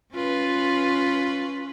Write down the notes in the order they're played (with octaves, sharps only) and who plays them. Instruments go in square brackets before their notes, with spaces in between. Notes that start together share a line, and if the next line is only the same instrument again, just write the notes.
[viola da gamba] C#4 F4 B4